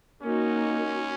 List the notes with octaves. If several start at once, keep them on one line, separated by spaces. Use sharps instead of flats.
A#3 C#4 D#4 F#4